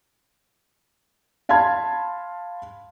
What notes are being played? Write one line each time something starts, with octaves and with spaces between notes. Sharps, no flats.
F5 A5 B5 C6 G#6